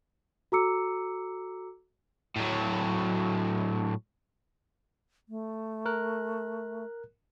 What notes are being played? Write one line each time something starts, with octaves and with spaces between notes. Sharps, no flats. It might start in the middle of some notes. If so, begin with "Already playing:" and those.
F#4 A4 A#5 D6 E6 C#7
A2 F#3
A3
A#4 F#6